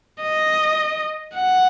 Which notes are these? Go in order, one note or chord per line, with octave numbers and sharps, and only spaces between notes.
D#5
F#5